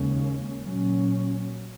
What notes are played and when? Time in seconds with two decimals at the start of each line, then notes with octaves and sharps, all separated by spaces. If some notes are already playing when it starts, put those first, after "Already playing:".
Already playing: D#2 C#3 G#3 C#4
0.62 A#2 F#3 C#4